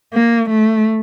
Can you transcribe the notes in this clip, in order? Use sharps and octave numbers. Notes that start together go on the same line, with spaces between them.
A#3
A3